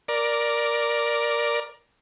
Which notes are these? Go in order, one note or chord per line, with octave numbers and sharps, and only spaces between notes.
A#4 D5